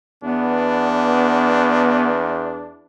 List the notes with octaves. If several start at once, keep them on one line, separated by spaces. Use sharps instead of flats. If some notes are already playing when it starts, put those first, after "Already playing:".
E2 B3 D4